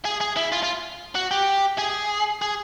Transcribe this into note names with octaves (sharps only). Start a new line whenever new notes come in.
G#4
G#4
E4
F4
F4
F#4
G4
G#4
G#4